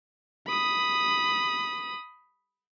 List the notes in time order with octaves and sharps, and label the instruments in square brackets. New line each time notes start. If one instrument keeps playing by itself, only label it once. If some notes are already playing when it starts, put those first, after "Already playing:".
[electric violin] B5 D#6